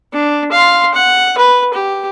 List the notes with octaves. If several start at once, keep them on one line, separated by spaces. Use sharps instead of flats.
D4
F5 C6
F#5
B4
G4